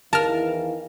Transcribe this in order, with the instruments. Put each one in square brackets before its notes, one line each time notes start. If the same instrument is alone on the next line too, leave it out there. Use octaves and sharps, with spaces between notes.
[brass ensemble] E2 D#3 E3 [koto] A#4 [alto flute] F5 [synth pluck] A5 F6